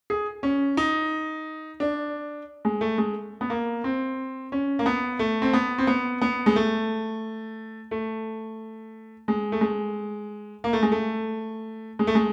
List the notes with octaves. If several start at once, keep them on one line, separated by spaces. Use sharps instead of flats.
G#4
C#4
D#4
D4
G#3
A3
G#3
B3
A#3
C4
C#4
A#3
B3
A3
C4
B3
C4
B3
B3
G#3
A3
A3
G#3
A3
G#3
A#3
A3
G#3
A3
G#3
A3
G#3